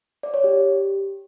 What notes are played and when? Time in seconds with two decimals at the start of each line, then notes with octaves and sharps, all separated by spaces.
0.23 D5
0.34 C#5
0.44 G4